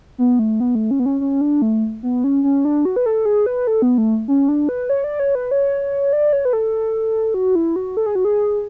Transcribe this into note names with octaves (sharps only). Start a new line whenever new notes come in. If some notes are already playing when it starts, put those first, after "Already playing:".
B3
A3
B3
A3
C#4
B3
C#4
C#4
D4
A3
B3
C#4
C#4
D4
F#4
B4
A4
G#4
B4
A4
B3
A3
C#4
D4
B4
C#5
D5
C#5
B4
C#5
D5
C#5
B4
A4
F#4
E4
F#4
A4
G#4
F#4
G#4